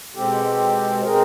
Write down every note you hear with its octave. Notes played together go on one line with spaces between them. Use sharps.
B2 G#3 C4 G4 A4
B2 G#3 C4 G#4 A#4